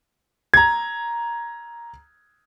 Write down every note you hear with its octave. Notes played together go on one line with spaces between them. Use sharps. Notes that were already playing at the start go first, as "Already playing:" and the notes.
A#5 G#6